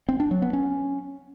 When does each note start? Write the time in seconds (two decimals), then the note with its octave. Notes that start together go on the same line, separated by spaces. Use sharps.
0.09 C4
0.20 D4
0.31 F#3
0.42 B3
0.53 C#4